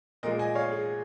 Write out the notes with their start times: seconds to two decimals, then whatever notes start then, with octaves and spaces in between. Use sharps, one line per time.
0.23 A#2 F3 G#3 A#4 D#5
0.39 D#5 G#5
0.55 C#5 F5
0.72 G#4